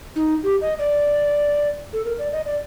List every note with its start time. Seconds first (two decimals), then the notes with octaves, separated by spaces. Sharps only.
0.16 D#4
0.43 G4
0.61 D#5
0.79 D5
1.93 A4
2.05 A#4
2.19 D5
2.32 D#5
2.46 D5